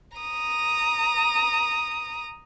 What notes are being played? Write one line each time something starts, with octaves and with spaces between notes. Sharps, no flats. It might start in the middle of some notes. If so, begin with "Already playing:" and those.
A#5 D#6